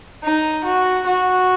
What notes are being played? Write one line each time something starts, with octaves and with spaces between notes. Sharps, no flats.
D#4
F#4
F#4